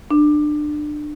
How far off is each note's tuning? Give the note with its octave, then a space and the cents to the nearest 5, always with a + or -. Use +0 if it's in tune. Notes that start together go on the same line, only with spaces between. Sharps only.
D4 +25